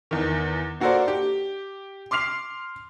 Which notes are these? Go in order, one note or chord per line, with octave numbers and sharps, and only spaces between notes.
E2 D#3
A#3 F#4 A4 A#4 C5 D5
G4
C6 D6 F6 C7 F7